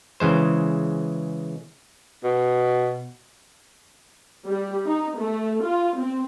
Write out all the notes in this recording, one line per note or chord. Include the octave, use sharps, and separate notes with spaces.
C#3 E3 G#3 C5
B2
G3
D#4
A3
F4
C4